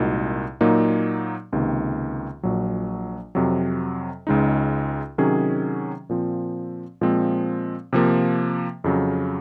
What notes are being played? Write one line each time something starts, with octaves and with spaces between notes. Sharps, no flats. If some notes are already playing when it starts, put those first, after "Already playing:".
Already playing: C2 A#2 G#3 D#4 F#4
A#2 F#3 A#3 D#4
C#2 C3 D#3 A#3
A#1 A#2 F#3
F2 C3 F#3
C#2 C#3 G#3 D#4
C3 D#3 F#3 C#4 G#4
A#2 F3 C4
A#2 F3 G#3 C4
C3 F3 A#3
F2 C#3 F#3